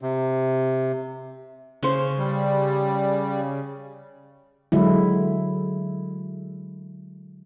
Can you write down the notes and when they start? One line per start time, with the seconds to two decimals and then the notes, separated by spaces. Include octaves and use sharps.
0.01 C3
1.83 C#3 C#4 C5
2.18 G3
4.72 D3 F#3 G#3 E4